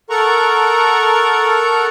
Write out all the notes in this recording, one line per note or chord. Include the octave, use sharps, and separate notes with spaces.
A4 A#4 F#5 A#5 C#6